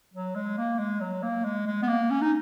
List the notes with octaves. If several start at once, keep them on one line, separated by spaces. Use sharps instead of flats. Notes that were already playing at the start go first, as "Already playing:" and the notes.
F#3
G#3
A#3
G#3
F#3
A#3
G#3
G#3
B3
A#3
C#4
D#4